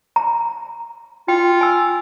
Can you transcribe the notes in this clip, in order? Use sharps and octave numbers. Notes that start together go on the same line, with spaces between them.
A#5
F4 G5
G#5 E6